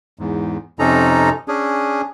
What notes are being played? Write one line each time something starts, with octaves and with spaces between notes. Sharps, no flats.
E2 G#2
F2 C3 C#4 D#4 A4 A#5
C#4 D4 G#4